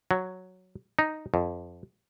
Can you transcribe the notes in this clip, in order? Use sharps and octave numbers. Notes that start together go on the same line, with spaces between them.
F#3
D#4
F2